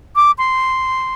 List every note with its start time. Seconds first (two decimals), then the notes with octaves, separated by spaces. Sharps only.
0.16 D6
0.38 C6